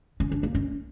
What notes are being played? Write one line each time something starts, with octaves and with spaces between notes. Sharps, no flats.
C#4
D4
A#3
C#4